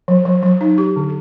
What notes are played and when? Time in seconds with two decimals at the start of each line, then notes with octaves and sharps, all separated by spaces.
0.08 F#3
0.26 F#3
0.43 F#3
0.61 D#4
0.78 G4
0.96 D3